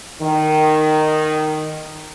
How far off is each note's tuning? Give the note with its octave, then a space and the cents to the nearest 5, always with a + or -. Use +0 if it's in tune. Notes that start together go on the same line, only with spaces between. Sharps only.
D#3 -10